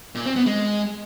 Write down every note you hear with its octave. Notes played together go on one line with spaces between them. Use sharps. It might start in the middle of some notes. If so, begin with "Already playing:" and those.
A#2
C4
B3
G#3